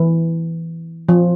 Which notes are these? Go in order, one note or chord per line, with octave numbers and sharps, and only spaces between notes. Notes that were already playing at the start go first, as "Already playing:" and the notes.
Already playing: E3
F3